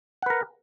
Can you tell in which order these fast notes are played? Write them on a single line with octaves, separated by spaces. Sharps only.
F#5 B4 A#4